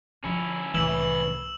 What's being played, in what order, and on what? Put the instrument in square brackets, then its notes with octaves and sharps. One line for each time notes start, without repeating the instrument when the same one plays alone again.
[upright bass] D3 F3 [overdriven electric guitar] C#4 E4
[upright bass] C2 A2 [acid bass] E3 [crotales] E6 E7 F#7